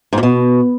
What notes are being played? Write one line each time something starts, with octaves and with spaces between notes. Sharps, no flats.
G#2
A#2
B2